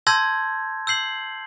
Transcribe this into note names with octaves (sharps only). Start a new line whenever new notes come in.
A5 C6 E6 G6 G#6 A#6
E6 G6 C7 F#7